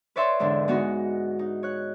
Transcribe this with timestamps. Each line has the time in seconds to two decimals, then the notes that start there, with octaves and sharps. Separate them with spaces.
0.16 B4 C#5 D5 E5 C6 E6
0.40 E2 G#2 D3 D4
0.68 G#3 B3 D#4 F#4
1.39 D#4
1.63 C#5 F#6